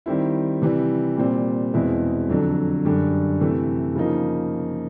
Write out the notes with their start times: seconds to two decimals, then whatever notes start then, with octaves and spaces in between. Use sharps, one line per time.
0.06 D#3 G3 C4 E4
0.62 C3 E3 G3
1.17 A#2 G3 C4
1.74 E2 B2 G#3 C4 E4
2.29 F2 D3 F#3
2.85 F#2 D3 G3
3.41 C3 E3 A3
3.96 C#3 F3 A#3 D#4